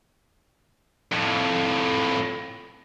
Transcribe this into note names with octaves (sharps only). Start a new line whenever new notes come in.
F2 A2